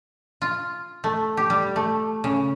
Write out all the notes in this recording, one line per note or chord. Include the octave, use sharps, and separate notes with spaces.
F4
A3
G4
G3
A3
C#3